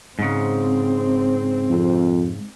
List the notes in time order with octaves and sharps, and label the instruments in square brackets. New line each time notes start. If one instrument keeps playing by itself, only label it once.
[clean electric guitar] G#2 C#3 [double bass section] C4
[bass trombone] F2